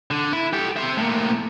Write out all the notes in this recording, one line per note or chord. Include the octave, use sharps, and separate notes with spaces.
D3
E4
G4 A4
C5 E5
A2 A#3